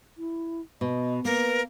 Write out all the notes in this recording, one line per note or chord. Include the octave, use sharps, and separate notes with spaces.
E4
B2 D#5
A#3 A#4 B4